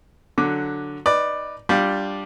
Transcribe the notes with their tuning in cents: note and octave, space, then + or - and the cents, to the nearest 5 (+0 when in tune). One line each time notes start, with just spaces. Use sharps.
D3 +0 F#3 +0 D6 +0
D#4 +0 B4 +0 D5 +10
G3 +0 D4 +0 F4 +10